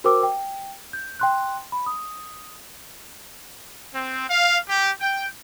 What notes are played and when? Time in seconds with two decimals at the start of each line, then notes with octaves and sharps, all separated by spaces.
0.04 F#4 A#4 C5 G5 D6 E6
0.23 G5
0.93 G6
1.20 G5 C6 F#6
1.72 B5
1.86 D#6
3.93 C4
4.29 F5
4.67 G4
5.00 G5